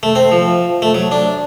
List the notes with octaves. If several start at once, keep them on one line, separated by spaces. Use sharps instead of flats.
A3
C4
F3
A3
F#3
D4